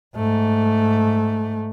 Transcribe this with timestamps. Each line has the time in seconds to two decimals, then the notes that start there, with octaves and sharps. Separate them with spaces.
0.16 G#2 A3